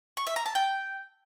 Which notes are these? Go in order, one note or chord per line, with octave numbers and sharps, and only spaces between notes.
C#6
E5
A#5
A5
G5